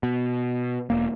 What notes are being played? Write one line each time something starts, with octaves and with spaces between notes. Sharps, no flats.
B2
E1 A#3